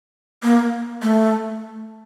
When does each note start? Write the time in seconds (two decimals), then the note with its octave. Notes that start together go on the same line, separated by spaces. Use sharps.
0.43 A#3
1.03 A3